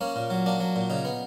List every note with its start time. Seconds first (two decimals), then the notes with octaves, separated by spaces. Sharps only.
0.01 A#3 C#4
0.16 A#2
0.30 F#3
0.46 A#3 D4
0.60 F#3
0.76 A#2
0.90 C#3 D#4
1.05 B3